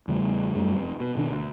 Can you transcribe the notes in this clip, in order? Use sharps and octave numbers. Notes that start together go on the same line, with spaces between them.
E2 C#3 G3 A3
F#2 G3 A3
F1 C3
B2
B2 D#3 D4
D2